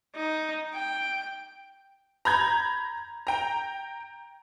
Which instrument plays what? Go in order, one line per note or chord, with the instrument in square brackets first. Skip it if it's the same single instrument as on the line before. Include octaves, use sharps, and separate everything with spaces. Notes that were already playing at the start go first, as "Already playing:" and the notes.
[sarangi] D#4
G5
[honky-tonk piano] A#5 B5 G6 G#6
G5 A#5